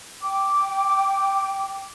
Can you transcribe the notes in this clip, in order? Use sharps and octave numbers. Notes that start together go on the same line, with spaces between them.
G5 D6